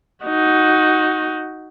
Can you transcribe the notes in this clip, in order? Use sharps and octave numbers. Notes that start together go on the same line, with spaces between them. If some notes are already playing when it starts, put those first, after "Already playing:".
D#4 F#4